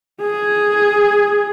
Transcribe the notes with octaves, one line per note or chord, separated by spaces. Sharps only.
G#4